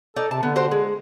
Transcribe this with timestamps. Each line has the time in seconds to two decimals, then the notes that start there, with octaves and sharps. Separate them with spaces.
0.16 D#4 A4 D5
0.31 C3 A5
0.43 D3 B3
0.56 F#4 G4 C5
0.71 G#3